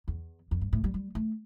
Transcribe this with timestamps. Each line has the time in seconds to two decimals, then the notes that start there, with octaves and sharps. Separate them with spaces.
0.08 E2
0.51 F2
0.61 G2
0.73 A2
0.84 G3
0.94 G3
1.15 A3